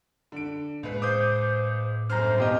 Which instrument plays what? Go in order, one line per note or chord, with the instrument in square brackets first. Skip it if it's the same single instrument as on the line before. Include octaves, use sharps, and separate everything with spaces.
[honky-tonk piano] D3 D7
[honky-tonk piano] C#2 B4 C7 [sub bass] A2
[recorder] C5 [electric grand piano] D6 D#6 G6
[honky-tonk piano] G1 F#2 [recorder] C5 [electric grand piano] A#5 F6
[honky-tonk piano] D#2 B2 [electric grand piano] C4 G4 D#5